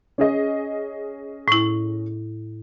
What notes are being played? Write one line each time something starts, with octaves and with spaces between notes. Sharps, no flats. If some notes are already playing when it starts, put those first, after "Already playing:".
C#4 G#4 D#5
A2 E4